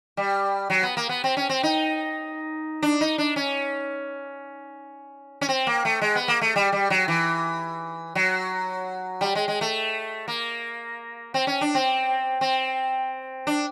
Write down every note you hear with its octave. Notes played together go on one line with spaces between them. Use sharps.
G3
F#3
B3
A#3
B3
C4
C#4
C4
D#4
D4
D#4
D4
C#4
C#4
C4
A#3
A3
G#3
B3
A#3
A3
G3
G3
F#3
E3
F#3
G3
G#3
G#3
A3
A#3
C4
C#4
D4
C4
C4
D4